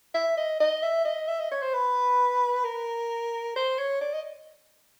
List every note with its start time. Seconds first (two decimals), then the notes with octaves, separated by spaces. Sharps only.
0.15 E5
0.37 D#5
0.60 D#5
0.83 E5
1.05 D#5
1.28 E5
1.39 D#5
1.52 C#5
1.62 C5
1.74 B4
2.65 A#4
3.56 C5
3.79 C#5
4.01 D5
4.14 D#5